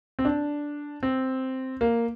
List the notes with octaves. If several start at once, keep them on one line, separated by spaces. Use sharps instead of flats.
C4
D4
C4
A#3